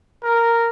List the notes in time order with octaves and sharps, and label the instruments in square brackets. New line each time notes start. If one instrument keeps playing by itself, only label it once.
[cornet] A#4